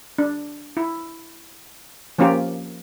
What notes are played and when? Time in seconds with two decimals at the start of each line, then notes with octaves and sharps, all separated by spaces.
0.18 D4
0.77 E4
2.18 F3 A#3 C#4 F4 G4 A#4